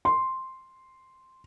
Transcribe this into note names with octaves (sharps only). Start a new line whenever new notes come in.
C6